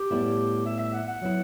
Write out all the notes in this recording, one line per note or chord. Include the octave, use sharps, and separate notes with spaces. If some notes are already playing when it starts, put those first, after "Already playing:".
Already playing: G4
A2 G3 B3 E4
E5
E5
F#5
F#5
F#3 B3 E4